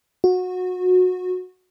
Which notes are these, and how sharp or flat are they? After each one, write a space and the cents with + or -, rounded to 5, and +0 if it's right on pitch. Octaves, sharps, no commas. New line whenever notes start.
F#4 -20